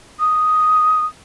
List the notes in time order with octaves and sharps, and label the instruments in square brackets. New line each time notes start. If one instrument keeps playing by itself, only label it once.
[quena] D#6